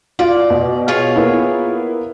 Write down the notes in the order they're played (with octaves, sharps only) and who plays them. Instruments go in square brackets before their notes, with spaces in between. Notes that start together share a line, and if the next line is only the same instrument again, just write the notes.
[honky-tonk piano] F4 [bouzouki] D5
[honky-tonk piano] B2
[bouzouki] F4 G#4 C#5
[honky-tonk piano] A#3 B3 E4